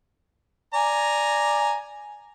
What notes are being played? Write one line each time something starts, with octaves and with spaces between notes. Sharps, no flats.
D5 G#5 A#5